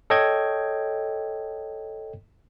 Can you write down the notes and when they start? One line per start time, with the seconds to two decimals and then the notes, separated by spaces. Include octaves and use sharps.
0.10 A4 C#5 D#5 G5 G#6